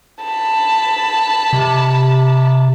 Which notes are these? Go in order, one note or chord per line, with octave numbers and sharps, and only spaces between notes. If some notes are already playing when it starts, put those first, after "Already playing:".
A5 B5
C3